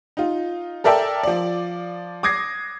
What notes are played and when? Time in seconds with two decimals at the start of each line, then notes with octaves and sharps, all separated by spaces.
0.17 D#4 F4
0.84 A4 A#4 D5 E5 G5 A5
1.23 F3 D5
2.23 D6 D#6 G#6 A#6 C7